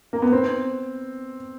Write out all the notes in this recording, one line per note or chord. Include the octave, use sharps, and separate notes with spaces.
A#3
B3
C4